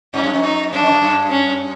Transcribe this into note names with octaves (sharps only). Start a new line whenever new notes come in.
G2 C#4
F#2
F2
D#4
F#2 D4
F2
F#2
F#2
C#4